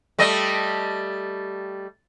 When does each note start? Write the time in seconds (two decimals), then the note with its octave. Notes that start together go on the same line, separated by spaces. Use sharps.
0.19 G3 A3 D#5